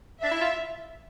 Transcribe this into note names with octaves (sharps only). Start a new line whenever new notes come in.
D4 E5
E4
F4